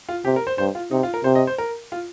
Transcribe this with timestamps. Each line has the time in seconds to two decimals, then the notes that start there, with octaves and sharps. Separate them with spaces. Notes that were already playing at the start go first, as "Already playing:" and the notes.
0.09 F4
0.25 C3 G4
0.36 A#4
0.47 C5
0.58 G2 C5
0.75 F4
0.91 C3 D#4
1.03 F4
1.14 A#4
1.24 C3 C5
1.35 D#5
1.47 C5
1.58 A#4
1.92 F4